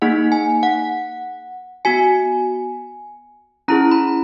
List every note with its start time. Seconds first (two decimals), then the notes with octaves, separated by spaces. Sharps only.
0.02 A#3 D#4 G#4 F#5
0.32 G#5
0.63 F#5
1.85 B3 F#4 G#5
3.68 C#4 E4 G#4 A#5
3.91 B5